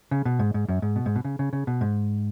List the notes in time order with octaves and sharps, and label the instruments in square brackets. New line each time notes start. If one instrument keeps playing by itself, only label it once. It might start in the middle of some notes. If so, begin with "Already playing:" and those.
[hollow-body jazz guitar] C#3
B2
G#2
G#2
F#2
G#2
B2
G#2
B2
C#3
C#3
C#3
B2
G#2